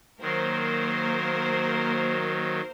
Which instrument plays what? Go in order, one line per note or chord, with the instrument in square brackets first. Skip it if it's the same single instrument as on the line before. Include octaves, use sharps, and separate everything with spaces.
[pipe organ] D#3 F#3 [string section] A#3 A#4 C5